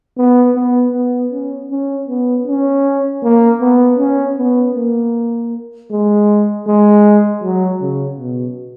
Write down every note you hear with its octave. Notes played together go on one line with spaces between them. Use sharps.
B3
B3
B3
C#4
C#4
B3
C#4
A#3
B3
C#4
B3
A#3
G#3
G#3
F#3
C#3
B2